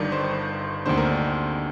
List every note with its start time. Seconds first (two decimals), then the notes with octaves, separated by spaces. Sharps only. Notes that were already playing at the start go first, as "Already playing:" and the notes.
Already playing: G1 G2 D#3 D5
0.12 C5
0.86 D2 C3 D#3 A#3 D4 C5
0.97 A#4
1.10 D5